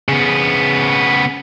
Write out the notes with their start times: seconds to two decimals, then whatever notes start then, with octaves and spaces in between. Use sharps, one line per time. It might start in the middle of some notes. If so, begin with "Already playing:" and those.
0.09 C#3 B3